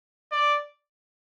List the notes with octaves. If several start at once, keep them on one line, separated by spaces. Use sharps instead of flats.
D5